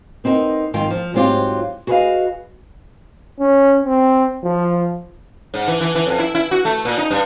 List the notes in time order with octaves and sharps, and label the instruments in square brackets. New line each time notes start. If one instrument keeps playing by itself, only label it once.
[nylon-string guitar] B3 C4 D#4 F#4 A#4
F2 G#2 D#3 F4 G5
F3
G#2 F#3 C4 F4 G4
F#4 G#4 B4 C5 D#5 F5
[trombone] C#4
C4
F3
[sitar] G#2
E3
E3
E3
F2
E4
E4
F#4
A3
A#2
D#4
G2